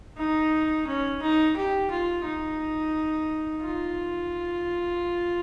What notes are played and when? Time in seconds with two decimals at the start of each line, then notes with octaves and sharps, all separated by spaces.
0.18 D#4
0.87 C#4
1.22 D#4
1.57 G4
1.91 F4
2.25 D#4
3.63 F4